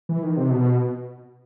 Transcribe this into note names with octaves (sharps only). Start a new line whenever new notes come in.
E3
D#3
C3
B2